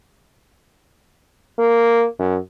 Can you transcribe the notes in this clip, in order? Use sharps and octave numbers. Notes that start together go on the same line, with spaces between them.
A#3
F#2